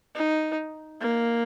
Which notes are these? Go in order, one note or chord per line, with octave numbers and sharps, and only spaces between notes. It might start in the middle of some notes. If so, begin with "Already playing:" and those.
D#4
A#3